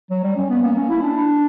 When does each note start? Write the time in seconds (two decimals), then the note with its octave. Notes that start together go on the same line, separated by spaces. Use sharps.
0.10 F#3
0.24 G3
0.36 C#4
0.50 B3
0.63 A#3
0.76 C#4
0.89 E4
1.02 D4